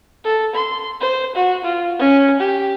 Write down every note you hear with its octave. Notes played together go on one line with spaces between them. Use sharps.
A4
C6
C5
F#4
F4
C#4
G4